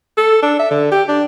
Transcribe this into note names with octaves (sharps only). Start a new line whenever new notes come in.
A4
D4
E5
D3
G4
D4